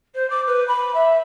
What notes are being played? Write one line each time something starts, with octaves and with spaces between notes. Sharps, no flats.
C5
D6
B4
B5
E5